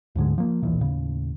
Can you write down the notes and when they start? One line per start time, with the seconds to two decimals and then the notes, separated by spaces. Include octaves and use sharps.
0.15 D2 G#2 D3 G#3
0.38 F3 A#3
0.63 D#1 B1 A#2 E3
0.81 D#2 A2 C#3